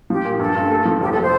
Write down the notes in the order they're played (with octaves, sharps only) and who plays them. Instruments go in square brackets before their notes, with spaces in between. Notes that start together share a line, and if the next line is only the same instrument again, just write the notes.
[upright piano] F3 [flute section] G4
[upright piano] A#2
[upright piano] G2 [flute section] A4
[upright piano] G2
A3
F3
[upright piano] F1 [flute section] G4
[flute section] A4
C5